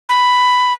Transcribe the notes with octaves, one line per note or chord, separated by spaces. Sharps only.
B5